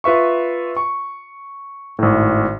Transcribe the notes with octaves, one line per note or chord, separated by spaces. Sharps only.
F4 B4 E5 C#6
C#6
G#1 A2